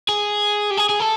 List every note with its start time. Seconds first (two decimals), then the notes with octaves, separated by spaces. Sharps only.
0.09 G#4
0.71 G4
0.78 G#4
0.90 G#4
1.00 A4